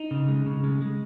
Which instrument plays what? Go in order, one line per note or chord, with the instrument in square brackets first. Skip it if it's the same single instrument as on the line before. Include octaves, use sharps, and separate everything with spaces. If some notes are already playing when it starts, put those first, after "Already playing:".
Already playing: [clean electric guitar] D#4
C#3
G#3
C#3
G#3
G#3